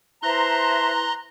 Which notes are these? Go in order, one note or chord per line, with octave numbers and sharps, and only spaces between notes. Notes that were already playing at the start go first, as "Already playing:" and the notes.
E4 B4 C5 E5 A5 A#5 C6 F#6